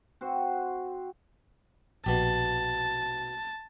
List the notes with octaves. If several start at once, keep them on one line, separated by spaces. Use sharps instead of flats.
C4 F#4 C5
A#1 B2 G4 A5